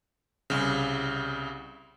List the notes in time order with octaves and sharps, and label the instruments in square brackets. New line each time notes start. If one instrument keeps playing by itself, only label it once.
[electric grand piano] C2 C#3